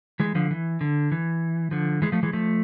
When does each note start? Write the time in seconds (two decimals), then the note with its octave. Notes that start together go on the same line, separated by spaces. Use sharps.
0.20 E3 G#3
0.35 D3 F3
0.51 E3
0.81 D3
1.12 E3
1.71 D3 F3
2.02 E3 G#3
2.12 F3 A3
2.23 E3 G#3
2.33 F3 A3